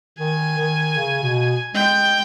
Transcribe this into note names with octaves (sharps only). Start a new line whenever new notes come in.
D#3 G#5
D#3
C#3
B2
G#3 G5